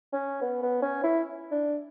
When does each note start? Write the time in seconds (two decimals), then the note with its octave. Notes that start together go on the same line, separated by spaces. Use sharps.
0.13 C#4
0.41 B3
0.62 B3
0.82 C#4
1.03 E4
1.51 D4